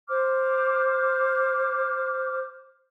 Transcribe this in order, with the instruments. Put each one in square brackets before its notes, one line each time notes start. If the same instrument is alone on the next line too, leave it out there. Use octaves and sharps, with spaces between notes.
[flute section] C5 D6 F6